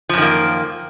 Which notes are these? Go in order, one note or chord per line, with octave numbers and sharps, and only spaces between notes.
F#2 D#3 F3 A#3